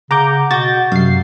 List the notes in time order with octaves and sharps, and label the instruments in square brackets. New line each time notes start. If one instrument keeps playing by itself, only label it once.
[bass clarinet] C#3 [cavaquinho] F#5 [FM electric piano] A#5 D6 G6
[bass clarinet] B2 [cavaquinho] F#4 [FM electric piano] G6 A6
[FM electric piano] F#2 C7 [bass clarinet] C3 [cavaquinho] F5